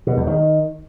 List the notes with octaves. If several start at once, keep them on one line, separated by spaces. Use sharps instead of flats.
B2
E2
D#3